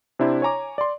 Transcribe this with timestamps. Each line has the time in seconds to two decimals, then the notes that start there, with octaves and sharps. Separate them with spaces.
0.19 C3 D4 E4 C5
0.42 C#5 G#5 A#5 D6
0.78 D5 C6